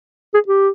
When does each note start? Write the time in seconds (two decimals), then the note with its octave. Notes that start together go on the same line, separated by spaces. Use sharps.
0.34 G#4
0.48 G4